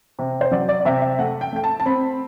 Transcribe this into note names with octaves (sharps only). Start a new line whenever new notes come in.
C3
C5
F#3 D5
D5
D5
C3 E5
E5
A3 F#5
G5
A3 G5
A5
A5
C4 B5